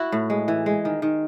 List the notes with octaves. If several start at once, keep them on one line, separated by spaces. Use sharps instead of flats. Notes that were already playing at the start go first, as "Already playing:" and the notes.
Already playing: E4 F#4
A2
G#3
E3
G#3
D#3
D#3